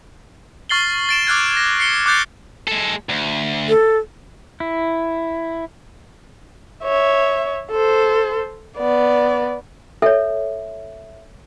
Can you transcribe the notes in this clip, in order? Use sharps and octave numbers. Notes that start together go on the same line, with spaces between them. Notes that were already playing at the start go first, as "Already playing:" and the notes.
C#6 F6 A6 C7 F#7 G7
A6 D7 E7
D6 F6 F#6 G#6
A#6
C7 C#7 G7
D6 F#6 G6 A6 C7
G#3 A4
D2
A4
E4
C#5 E5
A4 C5
B3 D5
A4 C#5 E5